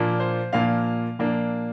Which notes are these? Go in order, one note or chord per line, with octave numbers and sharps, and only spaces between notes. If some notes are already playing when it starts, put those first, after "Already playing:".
Already playing: A#2 F3 A#3 D4
C5
A#2 F3 A#3 D4 F5
A#2 F3 A#3 D4